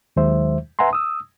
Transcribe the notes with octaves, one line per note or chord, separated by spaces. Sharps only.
D#2 D#3 F#3 G#3 C5 E5
B4 E5 F#5 G#5 A#5 C6
D#6 E6